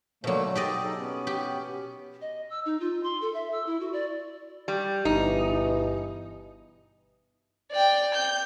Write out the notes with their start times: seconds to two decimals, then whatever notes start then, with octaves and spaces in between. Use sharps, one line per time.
0.24 B2 D3 F#3 A3 A#3
0.55 G4 G#4 D5 D#5
0.83 D#4 A4
0.98 B3 C#4
1.27 G4
2.21 D#5
2.50 E6
2.66 D#4
2.80 F4
3.03 C6
3.22 A4
3.34 E5
3.52 E6
3.66 E4
3.80 F#4
3.93 D5
4.68 G3
5.05 G1 G2 B2 E3 D#4 G4
7.72 D5 G5
8.15 G6